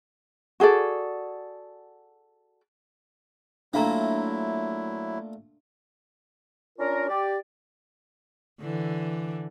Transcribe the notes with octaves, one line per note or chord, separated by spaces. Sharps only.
F#4 G#4 A4 D5
A#2 F#3 A3 A#3 D4 E4 F5 A#5
C#4 D4 F4 A#4
G4 D5
D3 E3